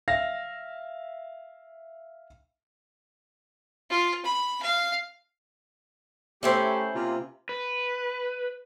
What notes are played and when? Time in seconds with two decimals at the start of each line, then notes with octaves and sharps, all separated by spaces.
0.08 E5 F5 A#6
3.90 F4
4.25 B5
4.62 F5
6.43 A3 C#4 E4 G4 C5
6.94 C3 A#3 F4
7.49 B4